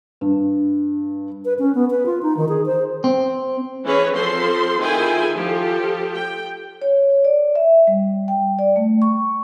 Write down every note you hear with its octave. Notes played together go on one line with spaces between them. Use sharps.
G2
B4
C#4
B3
B4
F4
D#4
D#3
G#4
C5
C4
E3 C#4 G#4 B4 C#5
F3 C4 A4 C5 C6
D#3 E4 F4 G#4 G5 G#5
F3 G4 A4
G5
C#5
D5
E5
G3
G5
D5
A3
C#6